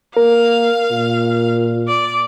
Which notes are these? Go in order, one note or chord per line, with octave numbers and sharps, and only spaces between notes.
A#3 A#4 F5
A#2
D5